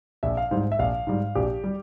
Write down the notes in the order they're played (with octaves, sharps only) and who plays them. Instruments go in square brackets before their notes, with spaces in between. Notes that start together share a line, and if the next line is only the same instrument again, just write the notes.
[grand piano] A#1 E5
F5
G#2 G3 C5
E5
A#1 F5
G#2 G3
A#1 G4
G3